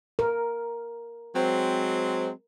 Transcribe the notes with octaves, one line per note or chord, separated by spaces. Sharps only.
A#4
F#3 G#3 C4